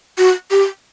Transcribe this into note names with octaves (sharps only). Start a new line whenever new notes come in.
F#4
G4